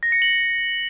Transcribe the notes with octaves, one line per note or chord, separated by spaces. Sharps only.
A#6
C#7
F#7